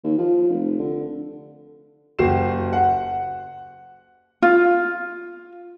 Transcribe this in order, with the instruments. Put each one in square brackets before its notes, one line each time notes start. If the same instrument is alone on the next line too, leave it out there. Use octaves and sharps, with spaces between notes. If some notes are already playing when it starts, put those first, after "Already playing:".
[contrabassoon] D#2
F3
F1
D3
[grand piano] F#1 F#4 G4 C7 E7
F#5
[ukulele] F4